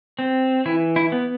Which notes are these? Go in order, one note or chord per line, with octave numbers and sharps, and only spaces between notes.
C4
E3 E4
E4
B3